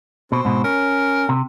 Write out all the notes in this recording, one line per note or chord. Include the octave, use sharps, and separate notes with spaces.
B2 C4
G#2 B2
C#4 A#4
C3